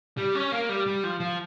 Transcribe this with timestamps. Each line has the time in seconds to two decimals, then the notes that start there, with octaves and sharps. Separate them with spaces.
0.17 G3
0.35 C#4
0.52 A#3
0.69 G3
0.86 G3
1.04 F3
1.20 F3